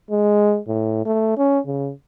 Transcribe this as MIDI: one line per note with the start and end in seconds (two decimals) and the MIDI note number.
0.11 0.59 56
0.68 1.04 45
1.06 1.32 57
1.38 1.59 61
1.66 1.91 49